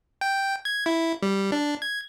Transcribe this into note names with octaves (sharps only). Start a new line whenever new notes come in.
G5
G#6
E4
G3
D4
G#6